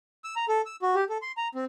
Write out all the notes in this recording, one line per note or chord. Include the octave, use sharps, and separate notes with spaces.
E6
A#5
A4
E6
F#4
G4
A4
C6
A#5
C4